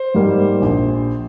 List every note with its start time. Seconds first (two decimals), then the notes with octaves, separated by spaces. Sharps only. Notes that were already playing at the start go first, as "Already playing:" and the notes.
Already playing: C5
0.15 G#2 G3 A#3
0.62 A#1